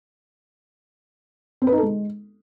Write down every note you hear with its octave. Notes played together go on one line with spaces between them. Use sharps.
C4
B4
D#4
A4
G#3